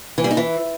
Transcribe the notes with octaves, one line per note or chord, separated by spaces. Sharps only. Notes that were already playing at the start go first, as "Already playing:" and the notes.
E3
G3
D#4
E3